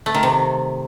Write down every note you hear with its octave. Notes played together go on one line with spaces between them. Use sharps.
A3
D#3
C3